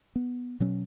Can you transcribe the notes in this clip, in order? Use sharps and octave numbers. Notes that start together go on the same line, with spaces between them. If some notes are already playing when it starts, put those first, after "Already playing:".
B3
B2 F#3 C#4